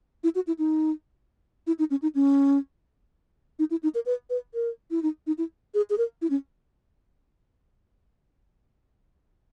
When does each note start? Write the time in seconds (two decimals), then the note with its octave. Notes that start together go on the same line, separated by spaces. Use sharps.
0.24 E4
0.35 F#4
0.47 E4
0.59 D#4
1.67 E4
1.79 D#4
1.91 C#4
2.02 D#4
2.15 C#4
3.59 D#4
3.71 E4
3.83 D#4
3.95 A#4
4.06 B4
4.30 B4
4.54 A#4
4.91 E4
5.03 D#4
5.27 D#4
5.38 E4
5.74 G#4
5.90 G#4
5.98 A#4
6.22 E4
6.30 C#4